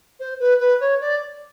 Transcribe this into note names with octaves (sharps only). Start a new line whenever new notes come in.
C5
B4
B4
C#5
D5